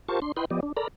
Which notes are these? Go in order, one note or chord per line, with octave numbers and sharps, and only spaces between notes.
F4 G4 A#4 C5 A5 C#6
D4 C6
E4 B4 D#5 G5 B5 C6
F3 B3 G4 D5 D#5
D4
A4 A#4 D5 A#5 B5